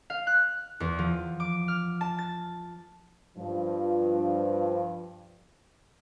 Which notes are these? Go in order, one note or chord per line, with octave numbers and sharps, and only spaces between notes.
F5
F#6
E2
F3
D6
F6
A5
A6
G2 F3